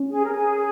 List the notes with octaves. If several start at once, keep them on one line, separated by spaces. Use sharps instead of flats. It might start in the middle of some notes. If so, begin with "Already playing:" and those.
Already playing: C#4
G#4
A#4
G#4